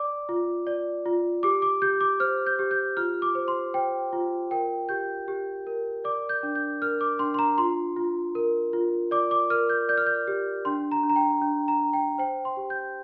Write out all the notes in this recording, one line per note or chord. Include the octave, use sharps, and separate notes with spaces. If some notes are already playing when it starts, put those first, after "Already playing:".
Already playing: D5 D6
F4
D5
F4
G4 D6
D6
G4 G6
D6
C5 F6
G6
G4
G6
F4 F6
D6
C5
C6
C5 G5
F4
A#4 G5
G4 G6
G4
A#4
D5 D6
G6
D4
G6
A#4 F6
D6
D4 C6
C6
A#5
F4 C6
F4
A#4
F4
D5 D6
D6
A#4 F6
G6
D5 G6
F6
G6
G4
D4 C6
A#5
D4
A#5
G5
D4
A#5
D4
G5
C5 G5
C6
G4
G6